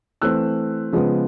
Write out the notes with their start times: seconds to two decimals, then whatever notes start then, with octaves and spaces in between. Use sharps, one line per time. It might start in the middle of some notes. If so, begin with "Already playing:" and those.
0.22 E3 A3 C4 E6 F#6
0.92 C#3 F3 G#3 B3